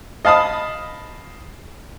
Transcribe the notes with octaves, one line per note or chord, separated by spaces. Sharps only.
D#5 F5 A5 B5 D#6